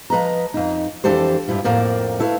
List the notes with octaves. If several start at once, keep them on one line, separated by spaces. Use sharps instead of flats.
F3 B4 D#5 A#5
F2 D#4
F2 E3 D4 G4 A4 C5
G2 G3 E4 F4
F2 A2 A#3 A#4 C5 D5
A3 E4 B4 F5